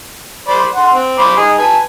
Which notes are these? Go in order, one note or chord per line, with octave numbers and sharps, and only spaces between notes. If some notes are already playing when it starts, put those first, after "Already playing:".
C5 D5 B5
F#5 C6
C4
C5 B5 D6
D#4 G#4
B4 G#5 A5